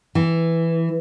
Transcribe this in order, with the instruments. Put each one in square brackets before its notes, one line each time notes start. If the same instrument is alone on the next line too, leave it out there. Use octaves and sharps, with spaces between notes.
[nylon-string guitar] E3